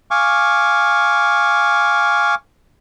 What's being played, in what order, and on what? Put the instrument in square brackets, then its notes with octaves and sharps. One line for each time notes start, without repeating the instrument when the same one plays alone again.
[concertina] F5 G#5 C#6 D6